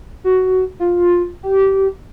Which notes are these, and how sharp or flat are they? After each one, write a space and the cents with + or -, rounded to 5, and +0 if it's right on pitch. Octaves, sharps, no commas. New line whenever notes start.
F#4 +10
F4 +10
G4 -20